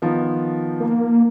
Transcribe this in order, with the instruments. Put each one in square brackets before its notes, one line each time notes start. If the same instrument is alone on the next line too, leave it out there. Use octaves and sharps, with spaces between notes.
[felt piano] D#3 F3 B3
[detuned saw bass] A#3